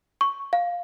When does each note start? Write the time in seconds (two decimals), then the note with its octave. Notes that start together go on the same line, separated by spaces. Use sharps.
0.21 C#6
0.53 F5